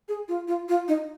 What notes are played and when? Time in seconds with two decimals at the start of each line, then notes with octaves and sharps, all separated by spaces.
0.09 G#4
0.28 F4
0.48 F4
0.69 F4
0.88 D#4